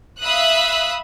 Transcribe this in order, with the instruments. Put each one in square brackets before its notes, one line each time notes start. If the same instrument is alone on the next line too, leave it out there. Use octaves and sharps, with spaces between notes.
[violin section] E5 F5 B5 D#6 E6 F#6